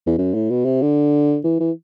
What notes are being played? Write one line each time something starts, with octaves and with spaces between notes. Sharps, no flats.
E2
F#2
A2
B2
C3
D3
E3
E3